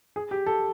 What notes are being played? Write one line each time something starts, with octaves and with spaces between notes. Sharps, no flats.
G#4
G4
A4